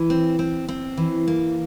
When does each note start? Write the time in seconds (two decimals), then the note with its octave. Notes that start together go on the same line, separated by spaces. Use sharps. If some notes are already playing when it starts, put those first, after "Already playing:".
Already playing: E3
0.10 C4
0.39 C4
0.69 C4
0.97 E3
1.28 A#3